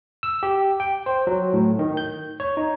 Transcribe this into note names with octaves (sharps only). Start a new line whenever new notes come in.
E6
G4
G5
C5
F#3
A2
D#3
G6
C#5
D#4